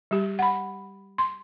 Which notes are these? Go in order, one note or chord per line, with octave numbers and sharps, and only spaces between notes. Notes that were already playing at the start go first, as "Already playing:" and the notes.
G3 G4
F#5 B5
C6